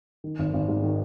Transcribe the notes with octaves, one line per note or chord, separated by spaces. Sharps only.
D#3
G#1
G#1
G#2
D#3